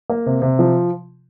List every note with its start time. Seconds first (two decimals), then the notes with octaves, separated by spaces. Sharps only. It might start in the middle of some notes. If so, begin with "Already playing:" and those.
0.10 A#3
0.26 C3
0.42 C3
0.59 F3